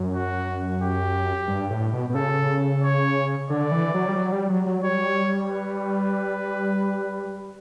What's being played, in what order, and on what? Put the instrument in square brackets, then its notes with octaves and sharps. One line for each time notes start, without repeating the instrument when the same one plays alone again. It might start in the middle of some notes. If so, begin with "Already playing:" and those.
Already playing: [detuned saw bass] F#2
[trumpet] F#4
G4
[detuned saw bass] G2
A2
B2
B2
[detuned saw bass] C#3 [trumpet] A4
[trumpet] C#5
[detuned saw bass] D3 [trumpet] D5
[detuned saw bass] E3
F#3
G3
F#3
G3
F#3
F#3
[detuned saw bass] G3 [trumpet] C#5
[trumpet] B4